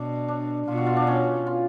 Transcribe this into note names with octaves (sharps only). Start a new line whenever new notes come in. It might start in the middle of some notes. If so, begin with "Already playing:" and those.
Already playing: B2 D4
D4
B2 F4
F#4
F4
D4
C#4
F4